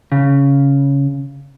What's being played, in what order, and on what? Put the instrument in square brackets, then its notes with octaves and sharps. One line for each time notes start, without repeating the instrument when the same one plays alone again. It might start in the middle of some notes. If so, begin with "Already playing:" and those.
[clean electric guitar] C#3